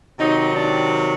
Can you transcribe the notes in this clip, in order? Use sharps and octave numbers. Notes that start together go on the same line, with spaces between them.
C3 D#3 F#3 D#4
D4